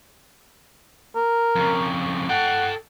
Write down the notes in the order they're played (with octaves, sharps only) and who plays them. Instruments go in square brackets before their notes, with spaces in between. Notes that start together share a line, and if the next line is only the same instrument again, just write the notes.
[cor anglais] A#4
[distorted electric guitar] F2 C#3
[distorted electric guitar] A4 G5 [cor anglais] F#5